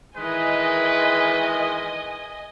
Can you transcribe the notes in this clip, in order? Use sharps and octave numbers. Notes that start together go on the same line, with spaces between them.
D#3 E3 G#3 B4 D#5 G#5